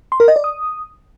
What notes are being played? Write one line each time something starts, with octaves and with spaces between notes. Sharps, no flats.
C6
A#4
D#5
D5
D#6